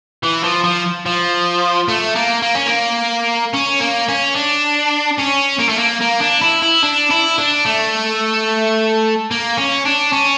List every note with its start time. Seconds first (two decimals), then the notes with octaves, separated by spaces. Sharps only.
0.23 E3
0.44 F3
0.64 F3
1.06 F3
1.88 A3
2.15 A#3
2.42 A#3
2.54 C#4
2.66 A#3
3.53 C#4
3.80 A#3
4.08 C#4
4.35 D4
5.18 C#4
5.59 A#3
5.69 A3
5.79 A#3
6.01 A#3
6.20 D4
6.42 E4
6.62 E4
6.83 D4
7.10 E4
7.38 D4
7.65 A3
9.31 A#3
9.57 C#4
9.85 D4
10.13 C#4